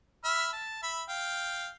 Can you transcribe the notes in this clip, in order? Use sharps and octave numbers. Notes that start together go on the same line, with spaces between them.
E5 B5 F6
A5
E5 B5
F5 G5